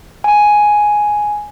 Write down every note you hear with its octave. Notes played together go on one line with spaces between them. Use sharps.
G#5